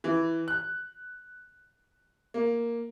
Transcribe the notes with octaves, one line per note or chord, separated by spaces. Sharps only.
E3
F#6
A#3